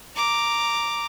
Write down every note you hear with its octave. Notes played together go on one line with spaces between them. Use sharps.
A#5 D6